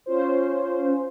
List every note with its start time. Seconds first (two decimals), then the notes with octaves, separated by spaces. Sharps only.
0.06 C#4 F4 C5